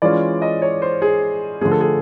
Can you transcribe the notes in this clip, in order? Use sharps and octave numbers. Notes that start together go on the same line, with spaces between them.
E3 G#3 C#4 F4 D5
D#5
C#5
C5
G#4
D3 F3 A3 G#4
A4
G#4